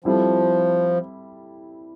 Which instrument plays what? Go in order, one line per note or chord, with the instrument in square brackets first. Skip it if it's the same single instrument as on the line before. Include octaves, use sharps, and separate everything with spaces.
[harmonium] F3 [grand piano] G3 C4 E4 A4